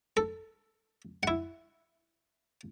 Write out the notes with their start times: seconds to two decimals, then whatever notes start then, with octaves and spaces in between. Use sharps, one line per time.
0.17 A4
1.23 E4 F#5